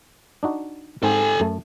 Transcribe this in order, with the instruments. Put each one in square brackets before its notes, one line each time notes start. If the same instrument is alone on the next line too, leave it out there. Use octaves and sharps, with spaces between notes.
[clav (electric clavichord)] D4 D#4 F#4
[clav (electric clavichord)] G#2 C4 A#5 [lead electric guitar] A4 G#5
[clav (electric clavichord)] F#2 A3 A5